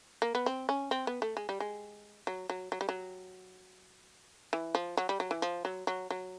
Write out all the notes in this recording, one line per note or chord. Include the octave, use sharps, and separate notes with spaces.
A#3
B3
C4
C#4
C4
B3
A3
G#3
G3
G#3
F#3
F#3
F#3
G3
F#3
E3
F3
F#3
G3
F#3
E3
F3
F#3
F#3
F#3